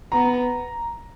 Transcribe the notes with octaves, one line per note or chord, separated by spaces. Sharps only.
B3 A#5